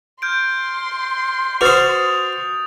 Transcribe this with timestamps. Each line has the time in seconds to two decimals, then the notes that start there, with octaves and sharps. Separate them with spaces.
0.22 C6 F6 G6 D7
1.61 F#4 B4 C5 D6 D#6 A6 F7